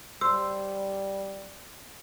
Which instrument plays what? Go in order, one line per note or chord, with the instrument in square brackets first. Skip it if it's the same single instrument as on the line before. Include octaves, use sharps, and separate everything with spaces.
[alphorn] G3 [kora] C5 [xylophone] E6